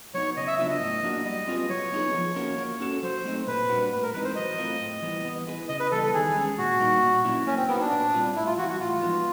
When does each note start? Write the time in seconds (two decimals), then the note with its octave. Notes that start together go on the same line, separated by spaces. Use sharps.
0.14 F#3 B3 D#4 C#5
0.37 C#3 D#5
0.47 E5
0.59 F#3 B3 D4 F4 E5
0.70 D#5
0.81 A2
1.03 F#3 A#3 D4 F#4
1.25 G3 D#5
1.47 C4 F4 G#4 B4
1.69 F#3 C#5
1.92 B3 D#4 G#4
2.14 F3
2.36 A#3 C#4 F#4 A#4
2.58 A#3
2.80 C#4 F#4 A4 C#5
3.03 F#3 C5
3.25 A3 C4 D#4
3.47 A#2 B4
3.69 G3 A#3 D4 F#4
3.92 A2 B4
4.02 A#4
4.13 E3 G#3 C4 D#4 B4
4.24 C5
4.35 F#3 D#5
4.58 A3 C4 F4 A#4
4.80 A2
5.02 E3 G3 B3
5.25 B3
5.47 E4 G#4 B4
5.69 C#3 D#5
5.80 B4
5.91 E3 G3 B3 A4
6.03 A4
6.14 D#3 G#4
6.36 G#3 C#4
6.58 A#2 F#4
6.80 G3 A#3 D#4
7.02 A#2
7.24 F#3 A#3 C#4 E4
7.47 A#3 C#4
7.57 C4
7.69 B3 D#4 F#4 A#4
7.80 D4
7.91 A#2
8.13 G3 C4 F4
8.35 A2 E4
8.46 F4
8.58 E3 F#4
8.61 G3
8.69 F#4
8.80 A2 F4
9.02 F3 G#3 B3 D#4